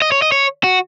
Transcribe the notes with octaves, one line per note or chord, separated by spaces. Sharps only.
D#5
C#5
D#5
C#5
F#4